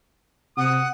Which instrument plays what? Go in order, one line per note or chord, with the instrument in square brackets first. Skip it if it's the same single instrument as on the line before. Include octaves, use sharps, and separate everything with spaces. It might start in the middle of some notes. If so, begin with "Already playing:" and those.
[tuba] C3 [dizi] F#5 [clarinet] D#6